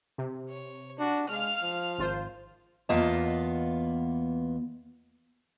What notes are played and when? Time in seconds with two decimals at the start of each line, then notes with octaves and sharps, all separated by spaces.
0.18 C3
0.50 C#5
0.99 D4 F#4
1.29 G#3 F5 F6
1.62 F3
1.98 G#1 F4 C5
2.89 E2 A#3 B3 F4 D#5 A5